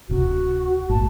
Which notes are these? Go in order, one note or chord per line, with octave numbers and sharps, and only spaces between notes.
D1 C3 F#4
A#1 G#2 A5